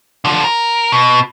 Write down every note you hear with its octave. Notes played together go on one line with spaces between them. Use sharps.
D3 F3
A#4
B2